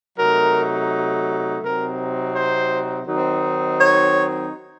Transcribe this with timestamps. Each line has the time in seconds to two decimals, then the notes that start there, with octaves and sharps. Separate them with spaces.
0.18 C3 F#3 A3 D#4 A#4
1.62 C3 F#3 C4 D#4 A#4
2.35 C5
3.06 D#3 F#3 C4 D#4
3.79 C#5